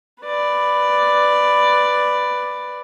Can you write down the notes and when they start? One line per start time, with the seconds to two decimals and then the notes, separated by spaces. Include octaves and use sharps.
0.24 B4 D5